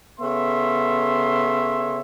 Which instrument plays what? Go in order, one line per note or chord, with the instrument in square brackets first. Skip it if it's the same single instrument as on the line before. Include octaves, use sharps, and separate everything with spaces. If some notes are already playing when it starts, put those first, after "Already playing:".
[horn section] C#3 B3 A4 C#5 E5 C6